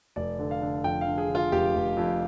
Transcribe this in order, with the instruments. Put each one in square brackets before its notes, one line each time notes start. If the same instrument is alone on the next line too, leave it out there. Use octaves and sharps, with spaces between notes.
[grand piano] F1 D5
D3
F5
D3
F2 G5
F5
D3
G#4
D3 F4
F1 G4
F1
F2